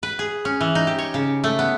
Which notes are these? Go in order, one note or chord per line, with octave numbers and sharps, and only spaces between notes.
B4
G#4
C#4
E3
D#4
G4
C#5
C#3
A3
B3